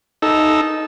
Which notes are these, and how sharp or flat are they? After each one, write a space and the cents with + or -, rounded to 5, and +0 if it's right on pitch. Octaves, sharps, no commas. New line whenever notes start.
D#4 +0 A4 -20 E6 +0